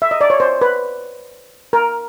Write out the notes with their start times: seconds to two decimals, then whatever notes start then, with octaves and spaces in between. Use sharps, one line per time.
0.02 E5
0.11 D#5
0.21 D5
0.30 C#5
0.40 C5
0.61 B4
1.73 A#4